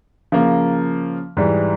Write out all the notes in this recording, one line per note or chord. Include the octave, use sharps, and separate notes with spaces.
C#3 F3 A#3
G#2 E3 G3